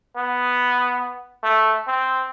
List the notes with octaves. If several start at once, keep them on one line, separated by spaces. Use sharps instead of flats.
B3
A3
C4